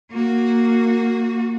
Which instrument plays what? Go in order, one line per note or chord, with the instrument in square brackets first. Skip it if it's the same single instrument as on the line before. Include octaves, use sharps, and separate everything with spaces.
[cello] A#3 F#4